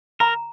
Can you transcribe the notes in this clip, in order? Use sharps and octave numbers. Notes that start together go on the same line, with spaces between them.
A#4 A#5